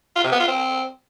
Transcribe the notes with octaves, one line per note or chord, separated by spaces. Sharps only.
F4
C3
B3
F4
C4